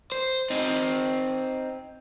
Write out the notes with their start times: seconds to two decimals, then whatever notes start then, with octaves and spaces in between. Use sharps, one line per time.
0.12 C5
0.50 C4 D#4